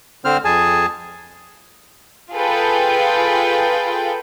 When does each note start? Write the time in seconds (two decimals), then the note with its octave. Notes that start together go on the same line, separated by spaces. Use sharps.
0.25 D3 C4 C5 F6
0.45 F2 G#4 G#5 A5
2.33 F4 G#4 A4 B4 G5